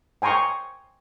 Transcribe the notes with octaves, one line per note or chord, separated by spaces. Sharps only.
G5 G#5 A#5 C6 C#6